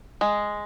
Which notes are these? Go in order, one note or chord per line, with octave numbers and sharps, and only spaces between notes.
G#3